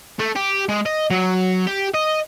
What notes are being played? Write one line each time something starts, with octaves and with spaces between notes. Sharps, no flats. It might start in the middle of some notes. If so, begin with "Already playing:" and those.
A3
G4
G#3
D#5
F#3
G4
D#5